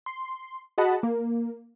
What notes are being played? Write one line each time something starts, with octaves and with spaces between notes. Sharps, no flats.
C6
F#4 G#4 D#5 F#5 A5 B5
A#3